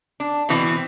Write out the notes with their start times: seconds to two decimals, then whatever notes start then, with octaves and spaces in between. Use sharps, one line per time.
0.20 D4
0.49 B2 E3 C4